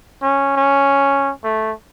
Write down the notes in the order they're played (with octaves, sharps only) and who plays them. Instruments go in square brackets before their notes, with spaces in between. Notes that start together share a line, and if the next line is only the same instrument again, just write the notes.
[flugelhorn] C#4
C#4
A3